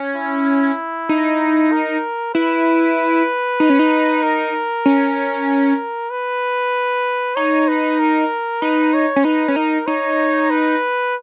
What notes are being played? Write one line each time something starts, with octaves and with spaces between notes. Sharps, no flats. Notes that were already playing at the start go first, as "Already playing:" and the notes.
Already playing: C#4
E4
D#4
A#4
E4 B4
D#4
C#4
D#4
A#4
C#4
B4
D#4 C#5
B4
A#4
D#4 B4
C#5
C#4
D#4 B4
C#4
D#4 A#4
D#4 C#5
B4